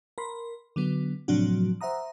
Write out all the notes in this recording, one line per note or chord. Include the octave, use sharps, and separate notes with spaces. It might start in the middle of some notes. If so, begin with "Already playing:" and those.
A#4 B5 C6
D3 F#3 B3
A2 C3 F3 F#3 D4 F#4
C5 E5 F#5 A#5 D#6